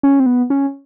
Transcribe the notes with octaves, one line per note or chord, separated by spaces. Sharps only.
C#4
C4
B3
C#4